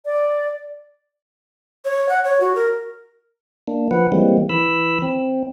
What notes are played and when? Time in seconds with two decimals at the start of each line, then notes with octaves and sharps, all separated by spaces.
0.05 D5
1.85 C#5
2.09 F#5
2.24 C#5
2.41 F#4
2.56 A#4
3.67 A#3 D4
3.91 F3 B4 F#5
4.12 E3 G3 G#3 A#3 C4
4.49 E3 B5 E6
5.02 C4